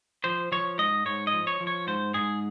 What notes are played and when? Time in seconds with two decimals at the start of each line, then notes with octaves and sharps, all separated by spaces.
0.24 F3 C5
0.52 F3 C#5
0.78 G#2 D#5
1.06 G#2 C#5
1.27 D#5
1.33 F3
1.47 C#5
1.60 F3
1.67 C#5
1.87 G#2 C5
2.14 G#2 G#4